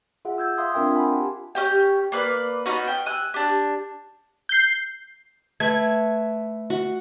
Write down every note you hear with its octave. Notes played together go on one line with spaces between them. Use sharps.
F4 G#4 E5 F#5
E6 G6 G#6
E5 F5 C6 D#6
C4 D4 F4 A#4 E5 G5
F#5 G#5 B5 C6
G4 A5
C#4 G4 G5
A#3 B4 D5
B3 C#4 D#4 F#4
G5
G#5 E6 F#6
D4 G4
G6 C7
A3 B4 G#6
F#4